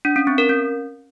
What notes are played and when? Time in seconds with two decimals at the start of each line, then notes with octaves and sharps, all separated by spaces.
0.05 D4
0.16 C#4
0.27 C4
0.38 A#4
0.49 C#4